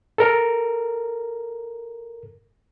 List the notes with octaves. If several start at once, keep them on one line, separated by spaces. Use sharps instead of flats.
A4 A#4